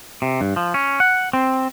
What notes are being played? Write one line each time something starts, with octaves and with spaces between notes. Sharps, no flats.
C3
G2
F3
C#4
F#5
C4